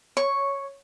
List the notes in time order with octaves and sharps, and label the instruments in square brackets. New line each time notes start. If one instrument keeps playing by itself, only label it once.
[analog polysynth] C#5 [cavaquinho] C#6